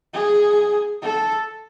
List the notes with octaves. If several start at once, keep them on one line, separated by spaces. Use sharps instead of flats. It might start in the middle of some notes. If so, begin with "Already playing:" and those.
G#4
A4